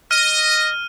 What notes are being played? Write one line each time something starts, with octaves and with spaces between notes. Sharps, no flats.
D#5 F6 D#7